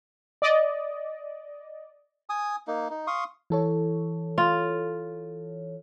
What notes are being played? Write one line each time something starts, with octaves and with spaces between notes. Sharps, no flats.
D5 D#5
G#5 D#6
A#3 D#4
D#4
F5 C6 C#6 D#6
E3 A4 C#5
F4